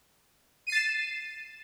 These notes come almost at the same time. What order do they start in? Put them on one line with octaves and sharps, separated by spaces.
D#7 C7 A6 E7